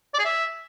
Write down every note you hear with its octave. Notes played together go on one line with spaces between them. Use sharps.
D5
G#4
E5